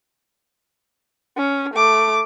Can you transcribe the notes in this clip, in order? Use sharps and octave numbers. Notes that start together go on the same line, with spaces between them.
C#4
A3 D6